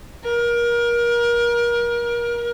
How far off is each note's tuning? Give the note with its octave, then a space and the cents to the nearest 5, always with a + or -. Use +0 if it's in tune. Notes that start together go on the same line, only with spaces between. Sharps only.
A#4 +30